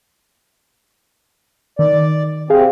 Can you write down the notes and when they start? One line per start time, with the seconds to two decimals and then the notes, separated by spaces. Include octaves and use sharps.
1.79 D#3 D5
2.50 C3 C4 G#4 F5